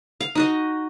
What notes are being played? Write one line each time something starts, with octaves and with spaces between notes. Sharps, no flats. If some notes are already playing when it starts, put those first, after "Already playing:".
F5
D#4 F#4 D#5